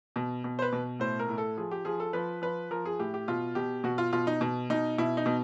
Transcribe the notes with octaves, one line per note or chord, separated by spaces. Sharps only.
B2
B2
C5
B4
B2
A2 C5
A#4
A2
A4
F3 G#4
G4
F3 G#4
A4
F3 B4
F3 B4
F3 A#4
G#4
A2 G4
G4
B2 F4
B2 G4
B2 F#4
F4
B2 F4
D#4
B2
B2 D#4
B2 E4
D#4
B2